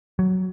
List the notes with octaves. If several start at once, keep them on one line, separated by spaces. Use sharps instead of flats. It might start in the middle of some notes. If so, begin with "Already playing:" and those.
F#3